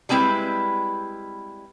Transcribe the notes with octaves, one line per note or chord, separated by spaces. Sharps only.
G3 G#3 C4 E4 B4